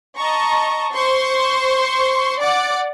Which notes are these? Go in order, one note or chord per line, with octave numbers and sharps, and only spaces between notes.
D#5 A5 A#5 C#6
C5 C6 C#6
D5 F#5 D6